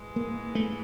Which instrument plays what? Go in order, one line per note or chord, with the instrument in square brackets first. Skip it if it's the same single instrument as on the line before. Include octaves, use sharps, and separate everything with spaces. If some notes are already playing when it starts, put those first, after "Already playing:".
Already playing: [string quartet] G#2 E3 G#3
[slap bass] A#3
A3